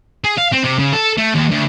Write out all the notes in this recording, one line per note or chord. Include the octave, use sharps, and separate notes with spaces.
G#4
F5
C4
C3
C#3
A4
A3
D#2
D2